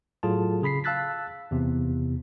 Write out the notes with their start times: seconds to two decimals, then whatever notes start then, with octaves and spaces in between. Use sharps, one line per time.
0.23 A2 F#3 F4 G#4 A4 A5
0.62 C#3 G#4 B5 B6 C7
0.84 F5 A5 E6 F#6 A6 B6
1.51 E2 C3